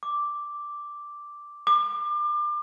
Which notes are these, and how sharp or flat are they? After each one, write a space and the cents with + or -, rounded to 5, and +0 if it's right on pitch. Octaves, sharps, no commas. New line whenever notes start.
D6 +0
D6 +30